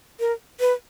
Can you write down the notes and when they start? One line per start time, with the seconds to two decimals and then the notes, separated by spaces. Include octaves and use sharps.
0.20 A#4
0.60 B4